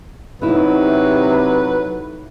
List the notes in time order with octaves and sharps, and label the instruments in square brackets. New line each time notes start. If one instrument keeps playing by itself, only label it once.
[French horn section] C3 [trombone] F#3 [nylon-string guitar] A3 D#4 E4 [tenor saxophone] B4